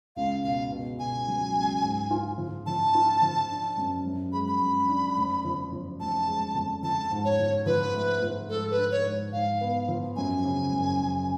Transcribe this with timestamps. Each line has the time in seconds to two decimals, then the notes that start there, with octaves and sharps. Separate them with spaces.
0.16 C#2 F5
0.44 B2 F5
0.71 B2
0.99 B2 G#5
1.28 F#3
1.56 C#2
1.83 G#2
2.11 F4
2.38 F3
2.66 F3 A5
2.95 F4
3.22 F3
3.50 D4
3.77 F#2
4.06 F#2
4.33 G#3 B5
4.48 B5
4.60 F#2
4.89 D4
5.17 F1
5.44 F3
5.72 F3
6.00 F1 A5
6.27 G#3
6.55 F2
6.83 F3 A5
7.11 G#2
7.24 C#5
7.39 F3
7.66 F3 B4
7.94 A3
8.22 F3
8.49 G#2 A4
8.71 B4
8.77 D4
8.91 C#5
9.05 G#2
9.32 G#2 F5
9.61 B3
9.88 F3
10.16 F#2 G#5
10.44 C#3
10.72 F#1
11.00 F#2